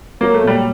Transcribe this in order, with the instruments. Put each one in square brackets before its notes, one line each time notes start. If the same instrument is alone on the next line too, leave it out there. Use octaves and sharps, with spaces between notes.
[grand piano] F#3 [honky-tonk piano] A#3
[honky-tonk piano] A3
[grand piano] A#2 [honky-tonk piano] G3